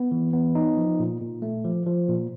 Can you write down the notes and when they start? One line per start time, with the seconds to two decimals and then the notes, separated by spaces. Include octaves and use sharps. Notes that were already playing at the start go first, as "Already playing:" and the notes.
Already playing: B3
0.11 E3
0.33 B3
0.55 D#4
0.77 F3
0.99 A#2
1.21 A#2
1.42 A3
1.64 F3
1.86 F3
2.08 A#2